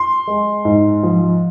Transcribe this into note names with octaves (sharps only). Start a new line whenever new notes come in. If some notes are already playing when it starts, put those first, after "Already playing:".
Already playing: C6
G#3
G#2
F3